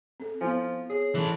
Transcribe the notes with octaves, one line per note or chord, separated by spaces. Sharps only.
C4 A4
F3 B3 E4 G#5
G#4 C#5
E3 A4